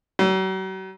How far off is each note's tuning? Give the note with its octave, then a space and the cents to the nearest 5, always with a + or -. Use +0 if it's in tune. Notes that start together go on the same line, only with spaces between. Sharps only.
F#3 +40